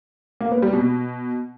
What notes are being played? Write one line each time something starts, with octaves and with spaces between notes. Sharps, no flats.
A#3
B3
G3
B2